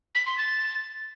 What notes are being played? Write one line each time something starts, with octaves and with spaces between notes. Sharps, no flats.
B6
C6
A6